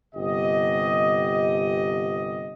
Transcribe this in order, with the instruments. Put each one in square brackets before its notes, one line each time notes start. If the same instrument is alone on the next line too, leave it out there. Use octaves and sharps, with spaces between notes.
[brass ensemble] G1 C3 G4 D#5